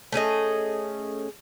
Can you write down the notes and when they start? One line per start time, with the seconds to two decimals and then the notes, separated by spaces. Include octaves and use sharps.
0.12 A3 C#4 G#4 D#5